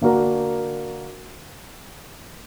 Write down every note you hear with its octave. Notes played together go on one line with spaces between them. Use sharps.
D3 A#3 D4 F#4 A#4